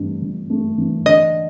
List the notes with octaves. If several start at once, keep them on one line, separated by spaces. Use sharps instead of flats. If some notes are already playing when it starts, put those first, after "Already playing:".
Already playing: G2 E3 A3
G1
A3
E3
D3 D#5